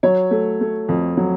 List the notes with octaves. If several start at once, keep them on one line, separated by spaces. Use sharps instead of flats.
F#3 C#5
A3
A3
F2
F#3